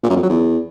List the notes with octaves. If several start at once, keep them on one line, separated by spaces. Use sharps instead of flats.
A#2
F#2
F2
F#3
E2